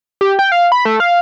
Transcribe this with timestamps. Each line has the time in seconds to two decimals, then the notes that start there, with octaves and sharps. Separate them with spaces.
0.21 G4
0.39 G5
0.52 F5
0.72 B5
0.85 A3
1.00 F5